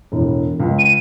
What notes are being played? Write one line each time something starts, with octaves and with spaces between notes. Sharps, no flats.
E1 A2
C#2
D#7